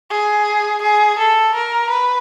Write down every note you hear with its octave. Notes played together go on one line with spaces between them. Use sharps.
G#4
G#4
A4
A#4
B4